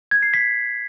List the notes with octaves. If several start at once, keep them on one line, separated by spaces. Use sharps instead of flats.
G#6
C7
B6